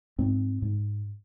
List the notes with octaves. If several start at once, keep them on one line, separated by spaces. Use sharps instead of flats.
G#2 C4
G#2